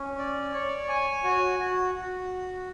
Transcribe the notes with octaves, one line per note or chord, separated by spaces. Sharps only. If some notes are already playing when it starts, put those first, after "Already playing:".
Already playing: C#4
D5
C#5
G#5
F#4
F#4
F#4